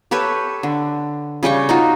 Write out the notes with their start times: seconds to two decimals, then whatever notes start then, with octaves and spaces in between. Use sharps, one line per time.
0.11 G4 A4 B4 C#5
0.63 D3
1.43 C#3 G3 G5 C#6
1.69 D#4 F4 F#4